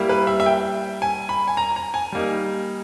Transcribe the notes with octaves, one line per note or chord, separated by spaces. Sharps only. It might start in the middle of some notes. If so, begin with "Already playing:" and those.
Already playing: G3 A#3 E4
B4
E5
E5
G5
G#5
B5
G#5
A#5
A#5
G#5
G3 A#3 D#4